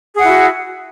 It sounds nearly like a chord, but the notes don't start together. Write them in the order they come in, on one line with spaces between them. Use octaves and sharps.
G#4 F#5 E4 F#4